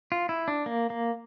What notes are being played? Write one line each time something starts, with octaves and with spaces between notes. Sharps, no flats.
F4
E4
D4
A#3
A#3